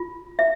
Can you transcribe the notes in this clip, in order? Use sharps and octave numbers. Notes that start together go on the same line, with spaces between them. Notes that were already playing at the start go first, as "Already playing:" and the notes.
Already playing: F4
E5